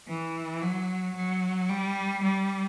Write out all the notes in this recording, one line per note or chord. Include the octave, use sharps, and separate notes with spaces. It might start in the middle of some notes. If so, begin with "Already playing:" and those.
E3
F#3
F#3
G3
G3